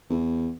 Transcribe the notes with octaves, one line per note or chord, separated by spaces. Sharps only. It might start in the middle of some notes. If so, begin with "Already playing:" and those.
E2